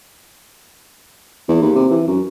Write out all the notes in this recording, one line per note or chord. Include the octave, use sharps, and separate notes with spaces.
E2
D#2
C3
E3
F#2